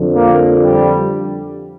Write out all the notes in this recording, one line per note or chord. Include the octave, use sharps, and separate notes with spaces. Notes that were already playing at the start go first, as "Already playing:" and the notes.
Already playing: F2 D3 F3
A#3
G3